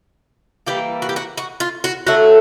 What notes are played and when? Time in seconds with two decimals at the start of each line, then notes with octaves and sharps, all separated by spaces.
0.67 E3 G3 A#3 G4
1.02 F#4
1.09 G4
1.16 F#4
1.37 F#4
1.60 F4
1.84 F#4
2.07 D3 F#3 A3 F#4